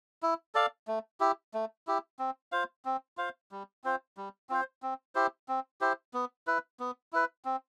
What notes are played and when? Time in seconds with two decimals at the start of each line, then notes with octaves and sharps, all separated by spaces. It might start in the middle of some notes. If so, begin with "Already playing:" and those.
0.23 E4
0.55 A4 D5 F5
0.87 A3
1.20 E4 G4
1.54 A3
1.87 E4 G4
2.19 C4
2.52 F4 C5 F5
2.85 C4
3.17 F4 C5 F5
3.51 G3
3.84 C4 F4 C5
4.17 G3
4.49 C4 F4 C5
4.82 C4
5.15 E4 G4 C5
5.48 C4
5.81 E4 G4 C5
6.14 B3
6.47 E4 B4
6.80 B3
7.13 E4 B4
7.45 C4